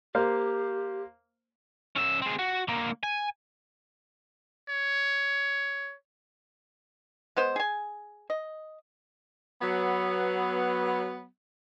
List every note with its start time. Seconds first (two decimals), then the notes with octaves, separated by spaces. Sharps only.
0.15 A#3 G4 C5 F5
1.96 C#4 E5
2.22 C4 G#4
2.39 F#4
2.68 D3 A#3
3.03 G#5
4.69 C#5
7.36 G#3 B3 C5
7.56 G#4 G#5
8.30 D#5
9.62 F#3 B3